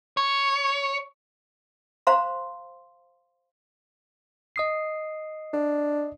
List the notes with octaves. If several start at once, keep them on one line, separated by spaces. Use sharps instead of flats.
C#5
C5 F5 A#5 C6
D#5 D#6 C7
D4